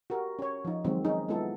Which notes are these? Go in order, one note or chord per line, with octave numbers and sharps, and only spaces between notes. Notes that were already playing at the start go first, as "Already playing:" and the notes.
F#4 G4 A#4
C#4 C#5
F3 D#4
D#3 F#3 G#3 C4
C#4 D#4 G#4
G#3 B3 C#4 E4 F4 A4